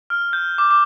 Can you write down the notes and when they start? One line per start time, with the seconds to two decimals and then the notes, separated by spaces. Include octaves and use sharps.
0.10 F6
0.33 G6
0.58 D6
0.71 D6